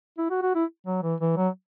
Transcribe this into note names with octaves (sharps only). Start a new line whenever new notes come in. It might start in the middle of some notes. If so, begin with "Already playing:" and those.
E4
F#4
F#4
E4
F#3
E3
E3
F#3